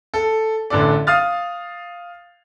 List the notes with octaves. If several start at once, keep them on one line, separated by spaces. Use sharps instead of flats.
A4
A1 D3 A4 D5
F5 D#6 F6 A6